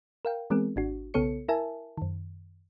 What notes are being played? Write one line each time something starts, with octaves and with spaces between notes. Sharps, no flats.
A#4 F5 G5
E3 G#3 B3 C4 G#4 A#4
G#1 D4 F#4
B1 C#3 B3 A4 C#5 C#7
E4 A#4 E5 G#5 A5
F#2 D#3